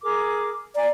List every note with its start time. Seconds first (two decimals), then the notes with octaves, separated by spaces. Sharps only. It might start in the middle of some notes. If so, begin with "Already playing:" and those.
0.03 G#4 A#4 D6
0.75 D5 G#5 A#5